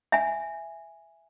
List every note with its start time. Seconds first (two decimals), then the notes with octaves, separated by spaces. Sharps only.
0.12 E5 G#5